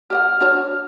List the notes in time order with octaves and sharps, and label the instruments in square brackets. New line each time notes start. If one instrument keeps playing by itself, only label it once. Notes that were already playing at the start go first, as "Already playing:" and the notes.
[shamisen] G4 D#5 F#5 [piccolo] F6
[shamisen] D4 F#4 C#5